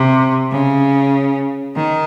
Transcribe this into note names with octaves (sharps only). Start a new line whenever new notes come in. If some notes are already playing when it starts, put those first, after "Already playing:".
Already playing: C3
C#3
D#3